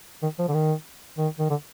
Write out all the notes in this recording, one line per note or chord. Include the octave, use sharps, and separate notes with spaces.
D#3
F3
D3
D#3
D#3
D#3
D3